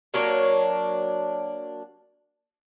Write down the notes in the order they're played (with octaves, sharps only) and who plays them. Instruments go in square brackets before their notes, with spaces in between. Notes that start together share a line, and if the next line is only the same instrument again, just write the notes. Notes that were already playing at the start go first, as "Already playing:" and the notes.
[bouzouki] F#3 A#3 D4 C#5